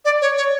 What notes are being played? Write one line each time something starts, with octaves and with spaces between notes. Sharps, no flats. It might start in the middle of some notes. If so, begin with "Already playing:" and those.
D5
C#5
C#5